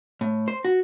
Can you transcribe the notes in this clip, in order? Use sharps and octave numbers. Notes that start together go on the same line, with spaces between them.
A2
C5
F#4